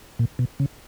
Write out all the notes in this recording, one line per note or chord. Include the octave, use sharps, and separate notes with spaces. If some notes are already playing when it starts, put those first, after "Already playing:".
A#2
B2
C#3